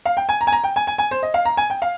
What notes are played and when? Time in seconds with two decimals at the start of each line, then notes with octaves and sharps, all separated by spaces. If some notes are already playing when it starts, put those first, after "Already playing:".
0.05 F5
0.17 G5
0.29 G#5
0.41 A#5
0.47 G#5
0.52 A#5
0.64 G5
0.76 G#5
0.87 G#5
0.98 G#5
1.11 C5
1.23 D#5
1.34 F5
1.45 A#5
1.57 G#5
1.70 G5
1.82 F5